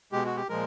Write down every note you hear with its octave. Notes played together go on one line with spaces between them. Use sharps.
B2 G#3 G4
F#4
G4
A#2 F3 G#3 A#4